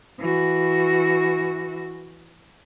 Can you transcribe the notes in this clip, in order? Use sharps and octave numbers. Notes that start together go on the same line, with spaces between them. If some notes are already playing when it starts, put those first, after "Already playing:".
E3 F#4